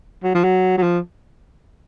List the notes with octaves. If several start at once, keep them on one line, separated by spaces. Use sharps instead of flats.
F#3
F3
F#3
F#3
F3